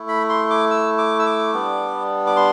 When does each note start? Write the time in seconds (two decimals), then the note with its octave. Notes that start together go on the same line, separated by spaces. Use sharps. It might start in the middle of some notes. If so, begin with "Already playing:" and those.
Already playing: A3 E4
0.08 B5
0.29 C6
0.50 D6
0.71 E6
0.98 D6
1.19 E6
1.26 D6
1.53 G3 B3 D4
2.27 D6
2.36 C6